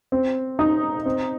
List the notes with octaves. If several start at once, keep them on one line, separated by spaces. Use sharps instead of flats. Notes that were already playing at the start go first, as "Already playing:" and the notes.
C4
D#4
C4